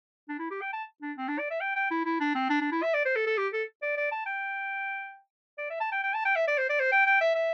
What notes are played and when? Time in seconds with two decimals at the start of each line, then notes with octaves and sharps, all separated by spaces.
0.29 D4
0.39 E4
0.51 G4
0.61 G5
0.73 A5
1.02 D4
1.18 C4
1.28 D4
1.38 D5
1.51 E5
1.61 G5
1.76 G5
1.91 E4
2.05 E4
2.20 D4
2.35 C4
2.50 D4
2.61 D4
2.72 E4
2.83 E5
2.94 D5
3.05 C5
3.16 A4
3.27 A4
3.38 G4
3.53 A4
3.82 D5
3.97 D5
4.12 A5
4.26 G5
5.58 D5
5.70 E5
5.80 A5
5.92 G5
6.04 G5
6.14 A5
6.25 G5
6.36 E5
6.48 D5
6.58 C5
6.69 D5
6.80 C5
6.92 G5
7.06 G5
7.21 E5
7.35 E5